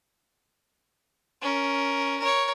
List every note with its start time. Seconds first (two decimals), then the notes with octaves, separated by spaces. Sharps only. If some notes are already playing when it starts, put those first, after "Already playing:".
1.41 C#4 A#4
2.19 A#4 C#5